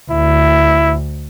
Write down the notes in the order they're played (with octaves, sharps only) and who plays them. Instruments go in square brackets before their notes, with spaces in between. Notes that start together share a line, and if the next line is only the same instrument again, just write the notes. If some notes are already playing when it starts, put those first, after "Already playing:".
[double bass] D2 [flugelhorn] E4